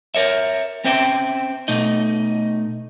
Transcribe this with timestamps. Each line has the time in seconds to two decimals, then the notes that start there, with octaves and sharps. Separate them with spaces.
0.15 A#4 C#5 E5
0.84 C4 C#4 C5 E5 G5
1.68 B2 A3 D#4 D#5